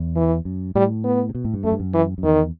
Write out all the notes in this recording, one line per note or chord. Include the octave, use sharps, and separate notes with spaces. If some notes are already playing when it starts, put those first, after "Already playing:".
Already playing: E2
E3
F#2
A2 G3
B3
C3
B2
A2
G2
F#2 A3
G2
F#2
E3
F#2
E2 D#3